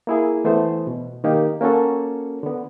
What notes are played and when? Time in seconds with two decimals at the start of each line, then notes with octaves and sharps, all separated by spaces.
0.07 A#3 E4 G#4
0.45 E3 A3 B3 C5
0.87 B2
1.24 D#3 A#3 D#4 G4
1.61 A#3 C#4 F#4 A4
2.43 D3 B3